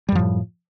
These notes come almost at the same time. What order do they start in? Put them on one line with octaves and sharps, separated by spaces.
G3 F#2 F3 A2